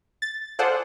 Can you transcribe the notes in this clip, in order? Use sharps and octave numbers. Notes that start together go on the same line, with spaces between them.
A6
F4 G#4 A4 C5 D5 F#5